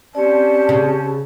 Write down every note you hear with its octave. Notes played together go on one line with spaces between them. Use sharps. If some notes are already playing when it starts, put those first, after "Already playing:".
C4 C#4 G4 C5 D5 A5
C#3